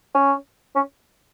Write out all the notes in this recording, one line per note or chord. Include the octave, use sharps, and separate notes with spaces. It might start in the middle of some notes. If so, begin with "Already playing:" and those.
C#4
C#4